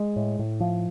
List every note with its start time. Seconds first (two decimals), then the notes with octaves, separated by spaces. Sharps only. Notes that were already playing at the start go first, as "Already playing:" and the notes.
Already playing: G#3
0.16 A2
0.39 A2
0.60 F3